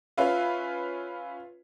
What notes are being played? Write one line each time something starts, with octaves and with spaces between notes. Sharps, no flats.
C#4 F4 B4 E5 F5